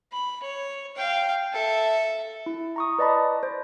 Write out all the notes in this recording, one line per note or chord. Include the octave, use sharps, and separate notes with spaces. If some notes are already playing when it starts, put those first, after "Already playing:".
B5
C#5
F5 G5
A4 E5
E4
A#5 C#6 D#6
B4 D5 D#5 A5 B5
C5